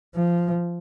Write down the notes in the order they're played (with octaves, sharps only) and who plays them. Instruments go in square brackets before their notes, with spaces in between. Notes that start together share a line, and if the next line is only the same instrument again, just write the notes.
[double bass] F3